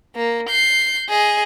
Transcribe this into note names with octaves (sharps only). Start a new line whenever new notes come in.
A#3
G6 C7
G#4 D#5